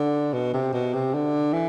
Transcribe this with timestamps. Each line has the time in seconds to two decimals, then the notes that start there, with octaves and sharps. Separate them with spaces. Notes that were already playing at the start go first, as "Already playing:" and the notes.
Already playing: D3
0.33 B2
0.54 C3
0.73 B2
0.94 C3
1.14 D3
1.53 E3